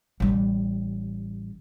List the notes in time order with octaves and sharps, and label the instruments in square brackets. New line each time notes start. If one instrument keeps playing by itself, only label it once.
[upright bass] A1 G3